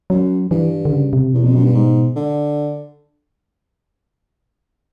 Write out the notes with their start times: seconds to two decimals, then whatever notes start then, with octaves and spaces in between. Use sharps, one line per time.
0.10 F#2 F#3
0.51 G2 E3
0.85 D3
0.92 C#3
1.13 C3
1.33 E2 B2
1.44 F2
1.55 F#2
1.65 G2
1.75 G#2
2.16 D3